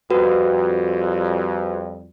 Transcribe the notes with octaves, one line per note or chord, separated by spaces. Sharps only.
F2 G3 F#4 B4